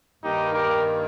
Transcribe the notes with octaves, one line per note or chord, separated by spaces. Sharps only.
G2 D#3 A#3 D#4 G4
G4 A#4